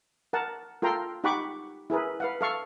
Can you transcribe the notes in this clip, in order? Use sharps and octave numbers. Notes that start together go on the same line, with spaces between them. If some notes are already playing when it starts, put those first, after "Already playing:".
A#4 F#5 A5
F4 A4 A#4 G5 A#5 C6
D#4 G4 F#5 B5 C#6 D6
E4 G#4 A#4 B4
B4 F5 F#5
A4 F5 C#6